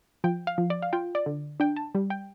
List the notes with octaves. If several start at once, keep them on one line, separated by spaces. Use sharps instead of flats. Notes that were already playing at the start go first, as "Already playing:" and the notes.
F3 G5
F5
F3
D5
F5
F4 G5
D5
D3
D4 G5
A5
G3
G5